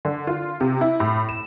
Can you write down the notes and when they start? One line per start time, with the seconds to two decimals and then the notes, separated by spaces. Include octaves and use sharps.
0.05 D3
0.27 F4
0.61 C3
0.81 E4
1.00 A2
1.29 E7